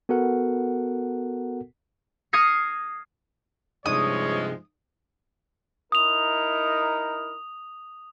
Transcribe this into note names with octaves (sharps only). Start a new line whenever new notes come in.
B3 F#4 A4 A#4 F#5
D#6 F6 G#6 A#6 C7 C#7
G2 C3 F3 G#3 D4 D#4 C#5 D#6
D#4 E4 A#4 D#6 F7